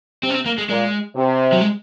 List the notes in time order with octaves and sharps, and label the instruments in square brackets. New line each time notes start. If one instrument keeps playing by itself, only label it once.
[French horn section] C3 [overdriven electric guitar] C4
[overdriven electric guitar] C#4
C4
A#3
G#3
[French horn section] A#2 [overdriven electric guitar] G#3
[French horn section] C3
[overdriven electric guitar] F#3
G#3